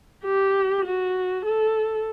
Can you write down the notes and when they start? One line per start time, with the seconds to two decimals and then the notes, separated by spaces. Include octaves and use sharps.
0.24 G4
0.85 F#4
1.45 A4